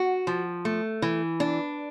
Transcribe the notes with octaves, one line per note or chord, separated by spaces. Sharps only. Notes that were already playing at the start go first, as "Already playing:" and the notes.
Already playing: F#4
F3
A3
E3
D4